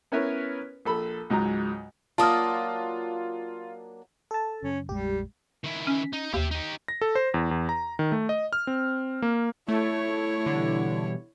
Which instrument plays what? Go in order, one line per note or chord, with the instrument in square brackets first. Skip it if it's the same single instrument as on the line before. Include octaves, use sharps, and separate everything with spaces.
[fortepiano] B3 C#4 E4 A#4 B4 C#5
A#1 A4 B5
C#2 G#2 F#3 A#5
[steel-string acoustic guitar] F#3 A#3 D4 [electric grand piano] F4 [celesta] A5 D#6 F6
[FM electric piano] A4 A5
[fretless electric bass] F#2 C#3 [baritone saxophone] C#4
[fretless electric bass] A#1 F2 G#3 [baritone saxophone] G3 [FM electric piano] G4
[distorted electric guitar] D#3 E4
[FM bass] C#4
[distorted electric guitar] D#4
[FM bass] D#2 [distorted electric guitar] G4 E5
[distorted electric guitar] D#4 G4
[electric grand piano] A#6
A4
C5
E2
E2
A#5
D#3
A3
D#5
F6
C4
A#3
[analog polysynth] A3 [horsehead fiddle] E4 C#5
[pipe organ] B2 E3 G3 [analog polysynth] D3